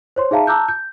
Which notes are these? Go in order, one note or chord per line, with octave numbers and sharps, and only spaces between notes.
C5 C#5 C6
D#4 G#4 E5 F5 A5 A#5
A5 A#5 D6 E6 F#6 G6
G6